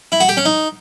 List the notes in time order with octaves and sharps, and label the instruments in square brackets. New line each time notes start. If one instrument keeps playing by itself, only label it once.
[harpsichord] E4
F#4
G4
C#4
D#4